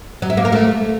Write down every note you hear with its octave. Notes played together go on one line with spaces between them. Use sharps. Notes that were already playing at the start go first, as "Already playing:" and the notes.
F#3
E4
A#3
A#4
A3